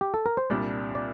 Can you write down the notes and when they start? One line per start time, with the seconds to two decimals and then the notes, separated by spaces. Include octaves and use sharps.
0.01 G4
0.14 A4
0.26 A#4
0.37 C5
0.50 C2 A#2 G3 D4 D5
0.95 D5